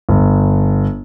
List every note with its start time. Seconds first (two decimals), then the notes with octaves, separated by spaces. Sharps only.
0.09 G1